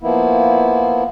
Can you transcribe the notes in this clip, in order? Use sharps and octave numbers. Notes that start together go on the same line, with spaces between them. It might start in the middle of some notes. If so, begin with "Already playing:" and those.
F3 A#3 B3 E4